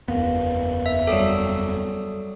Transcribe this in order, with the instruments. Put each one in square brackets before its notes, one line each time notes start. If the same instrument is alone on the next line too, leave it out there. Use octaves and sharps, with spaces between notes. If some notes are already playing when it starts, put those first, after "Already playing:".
[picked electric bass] F#1 E2 B3 [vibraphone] A#4 B4 F5
[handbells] E5
[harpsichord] F#3 G3 G4 [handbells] A4 [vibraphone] D#6